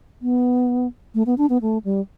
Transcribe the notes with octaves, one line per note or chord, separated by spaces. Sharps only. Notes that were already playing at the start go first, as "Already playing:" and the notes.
B3
A3
B3
D4
B3
A3
G3